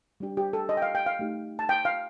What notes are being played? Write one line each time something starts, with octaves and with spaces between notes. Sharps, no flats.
G3 D4 G4
G4
A4
D#5
G5
F5
G5
F5
A3 D#4 G4
A5
G5
F5